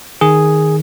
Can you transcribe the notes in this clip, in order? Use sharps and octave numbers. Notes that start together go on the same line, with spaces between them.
D#3 G#4